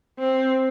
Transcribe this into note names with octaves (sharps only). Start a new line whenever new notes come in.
C4